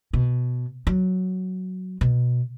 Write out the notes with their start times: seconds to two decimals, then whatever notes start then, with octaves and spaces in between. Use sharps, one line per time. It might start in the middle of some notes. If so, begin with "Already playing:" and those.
0.13 B2
0.87 F#3
2.01 B2